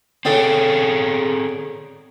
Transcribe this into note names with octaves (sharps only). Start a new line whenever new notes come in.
D3 C4 D4 G#4 C#5 G5